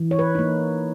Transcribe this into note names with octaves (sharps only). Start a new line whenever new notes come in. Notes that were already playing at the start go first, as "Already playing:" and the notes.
Already playing: E3
C#5
B4
A#3 D#4